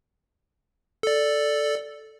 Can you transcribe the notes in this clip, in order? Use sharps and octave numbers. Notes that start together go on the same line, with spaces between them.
A4 D5